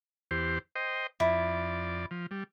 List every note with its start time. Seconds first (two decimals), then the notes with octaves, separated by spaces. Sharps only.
0.31 E2 G4 C5
0.76 C5 D#5 G5
1.20 F2 E4 D5
2.11 F3
2.31 G3